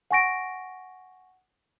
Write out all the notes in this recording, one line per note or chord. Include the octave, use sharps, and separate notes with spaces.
F#5 G#5 C#6 A#6 D7